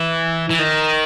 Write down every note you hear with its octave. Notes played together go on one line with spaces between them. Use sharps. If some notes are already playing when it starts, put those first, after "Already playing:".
Already playing: E3
E3
D#3